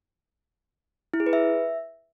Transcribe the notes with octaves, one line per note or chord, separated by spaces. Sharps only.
E4
G#4
B4
E5